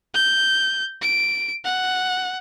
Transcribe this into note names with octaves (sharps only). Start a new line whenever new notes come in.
G6
D7
F#5